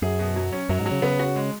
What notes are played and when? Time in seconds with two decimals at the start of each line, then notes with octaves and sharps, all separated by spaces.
0.02 F#2 G#4
0.19 B2
0.36 F#3
0.52 C#4
0.69 F#2 F#3
0.80 G#2
0.86 F#3
0.91 C#3
1.02 C#3 B3
1.19 F#4
1.36 G#3